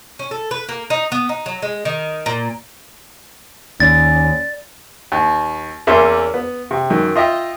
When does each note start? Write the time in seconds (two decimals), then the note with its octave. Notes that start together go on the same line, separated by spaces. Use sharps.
0.19 C#4
0.31 A4
0.51 B4
0.69 A#3
0.90 D#4
1.12 B3
1.29 D#4
1.46 F#3
1.62 G#3
1.85 D#3
2.26 A#2
3.80 D#2 C#4 D5 A6
5.12 D#2
5.87 E2 A#3 C#4 E5 C6
6.34 B3
6.71 C3
6.90 F#2 D#3
7.15 F4 D#5 E5 G5